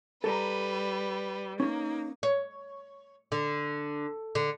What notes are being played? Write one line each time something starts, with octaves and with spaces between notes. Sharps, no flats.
G3 A4 B4 A#5
A#3 C#4 D#4
C#5
D3
D3